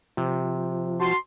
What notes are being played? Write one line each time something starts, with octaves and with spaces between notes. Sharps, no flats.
C3 F3
F#4 A5 C6